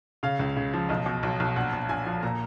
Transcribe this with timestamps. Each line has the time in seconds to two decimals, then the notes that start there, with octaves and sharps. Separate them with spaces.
0.23 C#3 F5
0.39 C#2
0.56 C#3
0.73 F3
0.89 B1 D#5
1.06 B2
1.23 B1
1.40 B1
1.56 A#1 F#5
1.73 A#1
1.89 A#1 G#5
2.06 F3
2.23 A#2 A#5